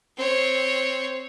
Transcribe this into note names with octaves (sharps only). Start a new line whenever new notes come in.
C4 C#5